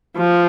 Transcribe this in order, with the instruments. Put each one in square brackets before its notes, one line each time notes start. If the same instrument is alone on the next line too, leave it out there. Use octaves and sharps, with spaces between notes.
[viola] F3